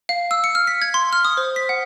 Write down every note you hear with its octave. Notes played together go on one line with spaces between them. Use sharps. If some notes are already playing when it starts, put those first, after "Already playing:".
F5
E6
C#7
F6
B6
G#6
C6
F6
D#6
C5
B6
F#5